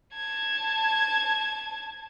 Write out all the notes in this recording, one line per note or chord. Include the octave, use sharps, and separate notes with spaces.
A5 G#6